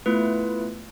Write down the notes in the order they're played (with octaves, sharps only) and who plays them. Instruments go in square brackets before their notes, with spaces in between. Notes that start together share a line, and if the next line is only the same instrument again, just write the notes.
[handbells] A3 B3 E4 F4 B4